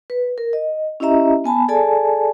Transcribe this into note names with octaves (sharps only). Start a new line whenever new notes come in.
B4
A#4
D#5
C#4 E4 G4 D#5 E5 A#5
B3 G#5 A5 B5
G#4 A4 D5 G#5 A5